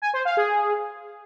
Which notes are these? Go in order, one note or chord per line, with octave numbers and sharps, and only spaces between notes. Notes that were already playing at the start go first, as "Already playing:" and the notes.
G#5
C5
F5
G#4